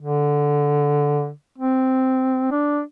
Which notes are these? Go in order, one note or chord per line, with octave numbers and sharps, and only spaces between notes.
D3
C4
D4